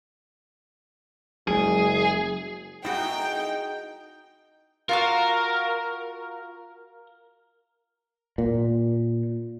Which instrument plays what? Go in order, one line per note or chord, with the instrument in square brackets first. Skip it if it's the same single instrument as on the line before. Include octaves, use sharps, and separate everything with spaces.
[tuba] F#1 [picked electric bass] F#3 G#3 [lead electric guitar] G#4
[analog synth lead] D#4 [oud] E4 F#4 [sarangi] G#4 [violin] G5
[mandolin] F4 F#4 F5 [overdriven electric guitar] A#4
[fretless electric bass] A#2